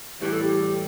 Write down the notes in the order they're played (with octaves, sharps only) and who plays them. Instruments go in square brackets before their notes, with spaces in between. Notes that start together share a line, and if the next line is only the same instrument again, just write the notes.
[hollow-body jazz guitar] A2 E3 G3 [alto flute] G4
[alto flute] A4
G4